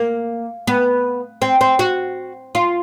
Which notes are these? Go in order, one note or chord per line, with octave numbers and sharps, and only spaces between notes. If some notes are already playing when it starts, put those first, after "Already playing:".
Already playing: A#3
B3
C4
C4
F#4
F4